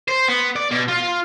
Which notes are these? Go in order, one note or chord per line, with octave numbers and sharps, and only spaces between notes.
C5
B3
D5
B2
F4